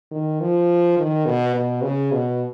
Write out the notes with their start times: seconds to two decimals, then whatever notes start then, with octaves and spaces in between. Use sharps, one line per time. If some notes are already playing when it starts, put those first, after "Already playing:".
0.11 D#3
0.41 F3
0.98 D#3
1.26 B2
1.55 B2
1.83 C#3
2.12 B2